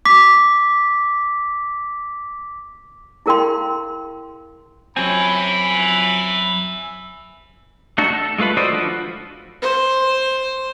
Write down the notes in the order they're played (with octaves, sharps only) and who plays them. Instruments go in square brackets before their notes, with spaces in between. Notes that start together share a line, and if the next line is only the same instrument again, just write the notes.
[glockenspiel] D6 B6
[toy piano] E4 G#4 A#4 F5 G5 C6
[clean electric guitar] F#2 F#3 C4 [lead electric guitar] E5 G#5 [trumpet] B5
[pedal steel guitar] A3 D4 D#4 F#4 A4
A4
G#3 A3 F4 B4 B5
F#4 A4 C5 D5 D#5
F3 D4 F4 F#4 B4
[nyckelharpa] C5